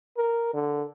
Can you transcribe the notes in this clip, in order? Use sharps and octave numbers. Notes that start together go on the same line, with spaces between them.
A#4
D3